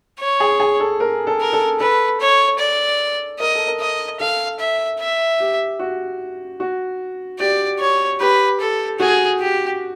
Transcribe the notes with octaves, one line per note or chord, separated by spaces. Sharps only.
C#5
G#4
G#4
A4
A#4
A4
A#4
A4
A4 B4
C#5
D5
A#4 D#5
A4
A#4
D#5
A4 F5
E5
E5
G4
F#4
F#4
G4 D5
C#5
G4 B4
A4
F#4 G#4
G4